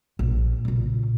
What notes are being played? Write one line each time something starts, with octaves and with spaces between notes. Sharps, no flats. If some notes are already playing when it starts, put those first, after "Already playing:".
A#1
A#2 C#3